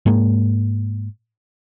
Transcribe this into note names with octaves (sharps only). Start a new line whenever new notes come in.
G#2 G#3 A#3